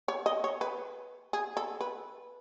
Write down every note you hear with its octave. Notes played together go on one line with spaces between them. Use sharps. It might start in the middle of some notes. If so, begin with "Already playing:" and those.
C#5
D#5
C#5
B4
G#4
A4
B4